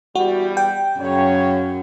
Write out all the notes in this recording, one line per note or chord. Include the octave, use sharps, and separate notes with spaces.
E2 G3 F#4
G5
F#2 C#3 C#5